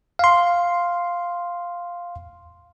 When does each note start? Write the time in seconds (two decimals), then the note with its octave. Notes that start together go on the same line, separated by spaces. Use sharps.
0.19 F5 C6